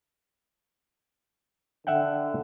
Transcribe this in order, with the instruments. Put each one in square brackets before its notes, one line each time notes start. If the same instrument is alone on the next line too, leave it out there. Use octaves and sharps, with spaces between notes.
[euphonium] D3 [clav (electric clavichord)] E5 F#5 G5